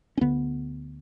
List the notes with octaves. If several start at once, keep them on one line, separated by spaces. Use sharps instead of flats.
C#4
D2 D3 B3